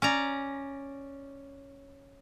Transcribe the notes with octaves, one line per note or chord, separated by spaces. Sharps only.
C#4 D5 A#5